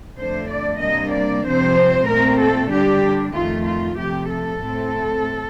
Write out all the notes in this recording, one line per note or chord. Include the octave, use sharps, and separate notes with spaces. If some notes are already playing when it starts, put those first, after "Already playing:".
F2 D3 A3 D4 C5
D5
C3 G3 A#3 D4 D#5
D5
C3 F3 C4 C5
A#2 A3 C4 A#4
A4
D3 G3 D4 G4
F2 D#3 A3 F4
F4
C3 F3 A3 G4
A4
A2 A3 C4